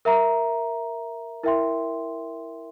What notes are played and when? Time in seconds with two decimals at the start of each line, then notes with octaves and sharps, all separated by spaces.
0.05 A#4 E5 A#5
1.43 E4 A#4 E5 G5 C6